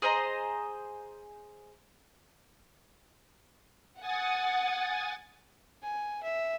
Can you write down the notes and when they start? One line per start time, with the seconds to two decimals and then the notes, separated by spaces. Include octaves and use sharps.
0.02 G#4 C5 D#5 A#5
4.00 F#5 G#5 D#6 A6
5.83 G#5
6.24 E5